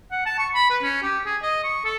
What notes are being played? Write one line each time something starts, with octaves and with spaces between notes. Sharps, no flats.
F#5
A5
C#6
B5
B4
C#4
G4
G#4
D#5
C#6
A4